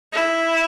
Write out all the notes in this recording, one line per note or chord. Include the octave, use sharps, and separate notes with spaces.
E4